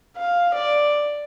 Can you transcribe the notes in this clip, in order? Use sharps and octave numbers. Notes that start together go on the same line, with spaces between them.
F5
D5